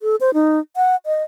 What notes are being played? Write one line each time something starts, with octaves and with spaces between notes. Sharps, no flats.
A4
C5
D#4
F#5
D#5